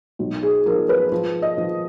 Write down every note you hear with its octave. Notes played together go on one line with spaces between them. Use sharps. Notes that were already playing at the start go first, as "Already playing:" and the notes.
B1
G#4
F3 A#4
B4
F3
D#5
F3